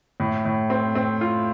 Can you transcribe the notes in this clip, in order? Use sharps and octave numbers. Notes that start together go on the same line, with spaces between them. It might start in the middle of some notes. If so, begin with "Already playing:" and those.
A2
A2
C4
C4
F4